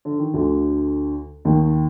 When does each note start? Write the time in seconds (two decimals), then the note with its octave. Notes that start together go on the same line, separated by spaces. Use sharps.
0.05 D3
0.19 D#3
0.33 D2 D3
1.45 D#2 D#3